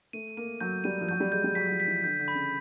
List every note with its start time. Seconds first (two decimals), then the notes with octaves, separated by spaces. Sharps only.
0.13 A3 D#7
0.37 A#3 D#7
0.61 F#3 G6
0.84 G3 D#7
1.01 F3
1.09 F#3 G6
1.20 G3
1.32 G#3 G6
1.44 G3
1.55 F#3 B6
1.67 F#3
1.72 F3
1.80 B6
1.87 E3
2.04 D3 G6
2.19 D3
2.28 B5
2.35 C#3